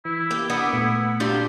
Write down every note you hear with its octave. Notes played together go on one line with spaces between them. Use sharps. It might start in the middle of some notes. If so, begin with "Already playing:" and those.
E3 E4
A#3 G4
B3 D4 A#4
A#2 A3
F#3 G3 D4 F4 G4